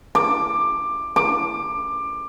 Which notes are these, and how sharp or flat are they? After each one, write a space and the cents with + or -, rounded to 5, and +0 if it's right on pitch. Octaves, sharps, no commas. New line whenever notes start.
D6 +15
D6 +20